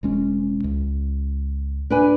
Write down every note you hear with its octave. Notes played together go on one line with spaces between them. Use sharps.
E1 G#3 C#4
C#2
D4 B4 G#5